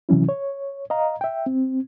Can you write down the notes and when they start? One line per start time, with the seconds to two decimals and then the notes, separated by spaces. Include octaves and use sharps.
0.09 C3 E3 F#3 C#4 E4
0.29 C#5
0.90 D#5 F5 A#5
1.21 E5 G5
1.46 C4